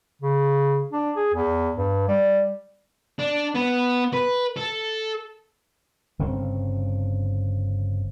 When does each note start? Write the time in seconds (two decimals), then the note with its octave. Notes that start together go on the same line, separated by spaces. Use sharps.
0.22 C#3
0.93 D4
1.16 G#4
1.34 E2
1.76 G2
2.08 G3
3.19 D4
3.55 B3
4.13 B4
4.57 A4
6.19 G1 C#3 C4